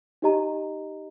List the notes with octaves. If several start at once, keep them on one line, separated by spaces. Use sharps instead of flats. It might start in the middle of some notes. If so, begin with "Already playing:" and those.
D#4 G4 D#5 A#5